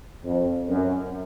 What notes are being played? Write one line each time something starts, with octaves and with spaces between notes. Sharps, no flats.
F2
F#2